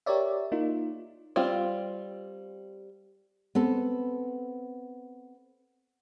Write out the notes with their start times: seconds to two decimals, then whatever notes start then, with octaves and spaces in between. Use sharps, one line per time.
0.06 G4 A#4 C#5 D5 E5
0.52 A#3 D#4 F4
1.36 G3 C4 F4
3.55 B3 C4 A4